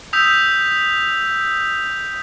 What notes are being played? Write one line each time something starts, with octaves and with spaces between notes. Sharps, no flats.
D#6 E6 G6 B6 F7